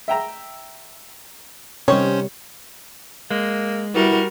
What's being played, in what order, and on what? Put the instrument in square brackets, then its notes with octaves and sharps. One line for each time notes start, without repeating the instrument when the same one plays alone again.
[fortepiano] E5 G5 A#5
[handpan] C3 G3 [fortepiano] D#3 [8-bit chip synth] C#4 C5 [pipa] C#5
[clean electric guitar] G#3 [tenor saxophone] A#3
[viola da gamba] G3 F#4 A#4 [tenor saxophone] B3 [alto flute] E4